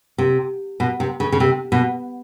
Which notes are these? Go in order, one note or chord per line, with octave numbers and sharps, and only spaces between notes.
C3
B2
C3
C#3
C#3
C3
B2